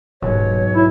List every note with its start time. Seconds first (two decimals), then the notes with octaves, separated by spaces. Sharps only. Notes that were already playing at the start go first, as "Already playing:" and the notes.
0.22 D#1 B1 G#2 C#5
0.75 E4